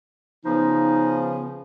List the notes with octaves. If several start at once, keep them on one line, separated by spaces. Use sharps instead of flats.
C#3 F3 B3 D#4